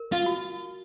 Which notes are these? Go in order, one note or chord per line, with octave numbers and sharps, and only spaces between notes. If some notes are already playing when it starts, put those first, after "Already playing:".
Already playing: A#4
F4
F#4